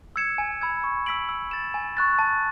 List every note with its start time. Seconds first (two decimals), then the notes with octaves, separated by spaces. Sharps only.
0.16 E6 G#6 C#7 E7
0.38 G#5
0.61 B5 E6 G#6
0.84 C#6
1.06 E6 B6 D7 F#7
1.29 E6
1.51 A6 E7
1.74 G#5
1.97 C#6 F#6 A6
2.19 A5